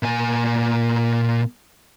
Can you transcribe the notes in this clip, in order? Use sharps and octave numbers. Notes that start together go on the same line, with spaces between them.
A#2 G#5